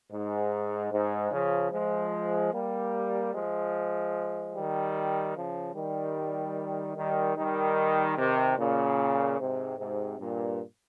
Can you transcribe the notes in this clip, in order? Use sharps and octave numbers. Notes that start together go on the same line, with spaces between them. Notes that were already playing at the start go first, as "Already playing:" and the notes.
G#2
G#2
C#3 F3
F3 G#3
G3 A#3
F3 G#3
D#3 G3
C#3 F3
D#3 G3
D#3 G3
D#3 G3
C3 D#3
A#2 C#3
G#2 C3
G#2 C3
G2 A#2